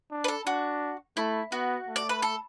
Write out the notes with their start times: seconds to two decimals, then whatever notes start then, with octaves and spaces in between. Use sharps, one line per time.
0.11 D4
0.24 B4
0.28 A4
0.46 D4 F#4
1.17 A3 E4
1.52 B3 F#4
1.88 A3
1.96 D5
2.09 B4
2.22 A4